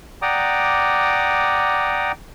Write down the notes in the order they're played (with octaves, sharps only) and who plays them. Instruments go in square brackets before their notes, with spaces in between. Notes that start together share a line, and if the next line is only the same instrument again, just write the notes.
[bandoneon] D5 F#5 G5 A#5 D6 D#6